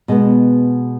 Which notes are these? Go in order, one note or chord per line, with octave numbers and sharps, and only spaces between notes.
B2 G#3 B3